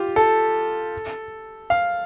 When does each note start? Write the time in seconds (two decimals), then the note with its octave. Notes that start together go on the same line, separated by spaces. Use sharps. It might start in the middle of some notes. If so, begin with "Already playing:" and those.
Already playing: F4 G4
0.16 A4
1.70 F5